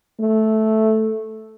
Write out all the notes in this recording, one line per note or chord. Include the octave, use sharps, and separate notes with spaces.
A3